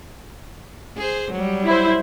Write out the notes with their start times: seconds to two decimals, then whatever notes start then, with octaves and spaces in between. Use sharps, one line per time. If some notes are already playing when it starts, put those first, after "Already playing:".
0.97 G#4 C5
1.31 F#3 G3
1.65 E4 C5